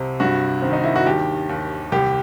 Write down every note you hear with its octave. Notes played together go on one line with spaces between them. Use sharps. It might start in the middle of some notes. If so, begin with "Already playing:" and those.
Already playing: C2 C3
G2 F#4
D#3 C4
D#4
E4
F#4
D#2 G4
D#2
C2 G4